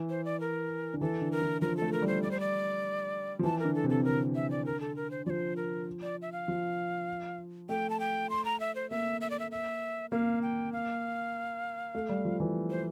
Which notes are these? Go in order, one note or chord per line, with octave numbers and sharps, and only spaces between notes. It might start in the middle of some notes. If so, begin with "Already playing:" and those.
Already playing: E3
C5
D5
A#4
D3
E3 A4
D3
A#4
E3
F3 A#4
A4
A3
A#4
G3
C5
D5
C5
D5
F3
E3 A5
A#4
D3
A4
C3
A4
D3 A#4
E5
D5
A#4
A4
A#4
C5
F3 C5 D5
A#4
D5
E5
F5
F3
A3 G5
A5
G5
C6
A#5
E5
C5
A#3 E5
E5
D5
E5
E5
A#3 F5
G5
F5
A3
G3
F3
E3
C5